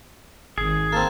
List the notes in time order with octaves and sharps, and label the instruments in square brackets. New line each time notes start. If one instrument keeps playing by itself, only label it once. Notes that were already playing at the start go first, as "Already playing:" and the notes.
[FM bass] G#1 [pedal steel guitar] G#4
[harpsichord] A#3 C4 [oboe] A5